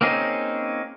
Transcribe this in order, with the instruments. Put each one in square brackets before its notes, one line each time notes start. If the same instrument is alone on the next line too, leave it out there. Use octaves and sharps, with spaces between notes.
[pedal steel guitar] A#3 C4 C#4 D#4 G#4